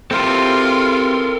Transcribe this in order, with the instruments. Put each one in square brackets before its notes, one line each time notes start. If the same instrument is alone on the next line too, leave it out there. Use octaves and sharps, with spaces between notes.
[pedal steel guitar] C4 E4 G4 [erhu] F4 [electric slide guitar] A4 A#4